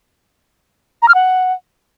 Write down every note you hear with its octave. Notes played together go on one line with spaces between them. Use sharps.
A#5
F6
F#5